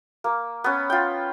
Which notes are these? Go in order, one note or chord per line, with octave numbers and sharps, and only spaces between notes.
A#3
B3 C#4
F4 G5